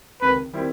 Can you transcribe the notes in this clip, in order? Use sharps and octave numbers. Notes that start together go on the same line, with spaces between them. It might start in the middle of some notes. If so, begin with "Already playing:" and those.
C#2 C3 D#3 B4
D#3 G3 C4 E4